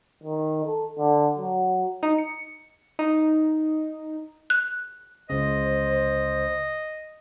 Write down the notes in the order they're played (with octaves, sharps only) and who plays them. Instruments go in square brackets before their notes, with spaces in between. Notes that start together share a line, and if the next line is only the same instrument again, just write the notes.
[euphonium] D#3
A4
D3
F#3
[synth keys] D#4
C#7
D#4
[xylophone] F#6
[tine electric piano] C#2 C#3 [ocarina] C5 [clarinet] D#5